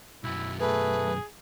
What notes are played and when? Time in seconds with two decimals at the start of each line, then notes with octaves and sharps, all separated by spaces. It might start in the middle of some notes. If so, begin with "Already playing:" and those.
0.24 B1 F#2 E4
0.60 A3 G#4 B4